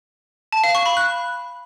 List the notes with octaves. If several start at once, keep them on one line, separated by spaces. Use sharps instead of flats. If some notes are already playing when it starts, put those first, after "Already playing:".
A5
F5
C#6
B5
F#6